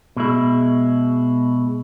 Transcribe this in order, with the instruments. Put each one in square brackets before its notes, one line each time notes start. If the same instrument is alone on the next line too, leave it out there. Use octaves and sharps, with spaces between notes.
[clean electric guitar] B2 G#3 E4